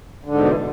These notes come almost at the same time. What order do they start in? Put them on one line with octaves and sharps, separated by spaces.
D3 G#2 B2 E2 E3